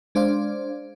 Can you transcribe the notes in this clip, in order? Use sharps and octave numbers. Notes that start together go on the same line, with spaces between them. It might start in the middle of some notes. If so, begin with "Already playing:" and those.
G#3 D4 C5 D5 F5